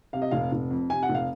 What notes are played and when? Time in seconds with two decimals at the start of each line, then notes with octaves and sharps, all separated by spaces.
0.13 C3 F5
0.22 D#5
0.31 F1 F5
0.52 F1
0.71 F2
0.90 C3 G#5
1.03 F#5
1.09 F1
1.15 F5